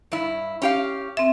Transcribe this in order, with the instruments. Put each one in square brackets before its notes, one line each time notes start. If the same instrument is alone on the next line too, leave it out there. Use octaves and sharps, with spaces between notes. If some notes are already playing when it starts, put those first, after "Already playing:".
[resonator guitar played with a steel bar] G2 E4
C#4 G4 F5
[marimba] C4 E5